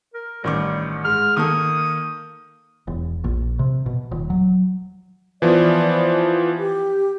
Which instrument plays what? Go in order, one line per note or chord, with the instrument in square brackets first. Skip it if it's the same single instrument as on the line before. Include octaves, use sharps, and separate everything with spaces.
[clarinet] A#4
[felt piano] A1 D#3 D6 [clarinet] G3
[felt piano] G#2 [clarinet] F6
[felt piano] D#3 A#3 A4 [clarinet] D#6
[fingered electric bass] E1
A#1
C3
B2
D#1
F#3
[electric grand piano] E3 F3 B3 [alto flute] D5
[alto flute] G4